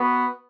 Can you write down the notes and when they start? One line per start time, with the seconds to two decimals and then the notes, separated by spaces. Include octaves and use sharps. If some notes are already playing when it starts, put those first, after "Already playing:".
Already playing: B3 F#4